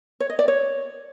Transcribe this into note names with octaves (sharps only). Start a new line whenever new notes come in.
C#5
D#5
D5
C#5